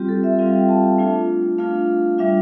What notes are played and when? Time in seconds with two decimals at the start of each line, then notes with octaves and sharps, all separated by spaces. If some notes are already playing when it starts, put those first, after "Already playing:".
Already playing: G3 C4 F4 G4
0.09 A4
0.24 E5
0.39 G3 C4 F4 F5
0.54 G5
0.69 A5
0.83 A5
0.98 A3 D4 F4
1.58 A3 D4 F4 F5
2.18 G3 D4 F4 E5